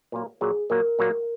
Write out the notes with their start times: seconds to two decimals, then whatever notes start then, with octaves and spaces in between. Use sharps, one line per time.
0.12 A#2 F#3 A#3
0.41 A#2 F#3 A#3 G#4
0.70 A#2 F#3 A#3 A#4
0.99 A#2 F#3 A#3